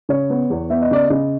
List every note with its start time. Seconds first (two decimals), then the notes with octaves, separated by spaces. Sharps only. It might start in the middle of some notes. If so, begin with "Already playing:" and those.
0.09 C#3 C#5
0.30 B3
0.50 E2
0.70 B3 E5
0.82 D#5
0.91 C#3 D5
1.04 D#5
1.10 C#3